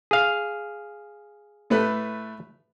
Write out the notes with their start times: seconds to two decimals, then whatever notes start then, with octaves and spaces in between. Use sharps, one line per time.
0.11 G#4 F5
1.70 A2 A3 B4